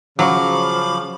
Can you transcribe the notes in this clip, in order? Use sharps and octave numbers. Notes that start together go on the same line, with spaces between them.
C#3 F3 F#3 F5 B5 C#6 D6